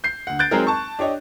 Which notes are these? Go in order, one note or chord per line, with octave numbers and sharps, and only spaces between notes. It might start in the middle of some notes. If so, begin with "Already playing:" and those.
G6 C7
D2 F#5
F#6 G6 A6 D7
F#3 G#3 C4 D#4 G#4 A#4
A5 C#6
D4 G4 C#5 D#5